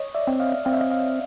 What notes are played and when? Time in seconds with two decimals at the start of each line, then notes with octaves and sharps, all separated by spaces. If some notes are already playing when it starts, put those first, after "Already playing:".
Already playing: C#5 D#5
0.15 D5 E5
0.27 C4
0.40 D#5 F5
0.65 C4 F5
0.73 E5
0.79 D#5 F5
0.90 D#5 F5